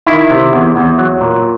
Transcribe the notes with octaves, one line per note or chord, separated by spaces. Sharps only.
D#3 E4
C3
E2
E2
F#3
A#2